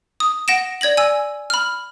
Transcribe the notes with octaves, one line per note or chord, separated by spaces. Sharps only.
D#6
F#5 A#6 D7 E7
D5 G#6 A#6 F#7
G#5 E6
B5 F6